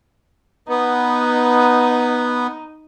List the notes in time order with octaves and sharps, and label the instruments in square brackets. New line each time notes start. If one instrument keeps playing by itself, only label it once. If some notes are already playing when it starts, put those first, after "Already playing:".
[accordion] B3 [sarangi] D#4